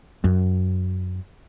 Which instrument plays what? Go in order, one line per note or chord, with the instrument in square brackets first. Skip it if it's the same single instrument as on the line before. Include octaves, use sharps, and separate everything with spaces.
[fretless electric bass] F#2